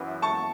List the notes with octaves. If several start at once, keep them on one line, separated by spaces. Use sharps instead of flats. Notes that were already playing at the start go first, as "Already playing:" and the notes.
Already playing: F#2 E3 B3
A5 C#6